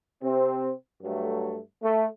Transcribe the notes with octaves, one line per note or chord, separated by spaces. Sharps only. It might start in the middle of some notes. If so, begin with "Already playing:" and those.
C3 C4
G2 F#3 A3
A3